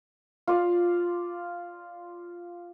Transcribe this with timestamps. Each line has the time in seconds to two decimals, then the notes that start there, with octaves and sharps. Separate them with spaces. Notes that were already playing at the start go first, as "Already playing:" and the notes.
0.47 F4 D5 F5